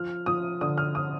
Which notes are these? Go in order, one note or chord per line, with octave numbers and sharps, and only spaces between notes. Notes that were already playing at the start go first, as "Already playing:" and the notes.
Already playing: F3 F6
F3 D#6
D3 D#6
F6
D#6